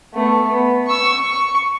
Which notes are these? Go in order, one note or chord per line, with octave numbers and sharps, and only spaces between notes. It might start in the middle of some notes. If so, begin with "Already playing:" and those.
A3 B3
B3
C#6 E6
C#6